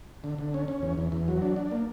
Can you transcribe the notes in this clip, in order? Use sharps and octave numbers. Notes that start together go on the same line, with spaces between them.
D3
D3
C#4
C#4
E2
E2
E2
F#3
D4
D4
A#3